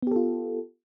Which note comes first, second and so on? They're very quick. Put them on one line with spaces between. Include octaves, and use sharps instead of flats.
B3 G4 A4 F4